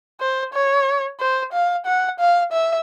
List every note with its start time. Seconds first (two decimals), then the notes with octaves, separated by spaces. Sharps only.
0.20 C5
0.53 C#5
1.20 C5
1.53 F5
1.86 F#5
2.20 F5
2.52 E5